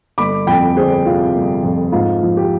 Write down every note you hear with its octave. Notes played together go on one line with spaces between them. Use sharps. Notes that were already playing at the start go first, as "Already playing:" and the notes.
G1 B5 D6
F2 G5 B5
G1 G#4 C5
C3 F4
G1
F2
G#2 F4
F3
G4